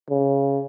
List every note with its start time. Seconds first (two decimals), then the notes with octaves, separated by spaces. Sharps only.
0.10 C#3